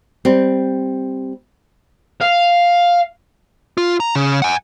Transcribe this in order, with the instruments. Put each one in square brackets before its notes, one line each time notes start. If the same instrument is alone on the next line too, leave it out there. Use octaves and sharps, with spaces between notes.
[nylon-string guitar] G3 C4
[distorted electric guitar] F5
[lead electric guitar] F4
A#5
C#3
F#5 G#5